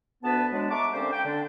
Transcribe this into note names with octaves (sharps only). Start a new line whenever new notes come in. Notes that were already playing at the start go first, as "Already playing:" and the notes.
D2 B3 B4 A5
F#3 G#3 D4
E5 A5 A#5 C#6 D6
D3 A#3 C4 C#4 G4 C5
G5
D3 D4